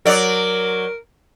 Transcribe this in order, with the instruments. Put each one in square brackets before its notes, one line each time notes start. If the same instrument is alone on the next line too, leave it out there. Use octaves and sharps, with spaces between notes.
[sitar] F#3 D5 [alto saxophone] A#4